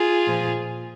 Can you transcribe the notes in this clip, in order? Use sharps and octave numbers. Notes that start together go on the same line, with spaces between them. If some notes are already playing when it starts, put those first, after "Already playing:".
Already playing: F4 G#4
A#2 F3